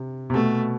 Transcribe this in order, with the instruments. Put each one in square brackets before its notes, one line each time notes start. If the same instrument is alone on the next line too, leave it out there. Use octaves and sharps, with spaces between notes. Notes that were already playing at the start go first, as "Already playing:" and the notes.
Already playing: [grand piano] C3
C3
[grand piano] B2 [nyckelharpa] A3